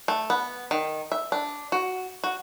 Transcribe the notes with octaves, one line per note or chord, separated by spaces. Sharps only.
A3
B3
D#3
E5
D4
F#4
F#4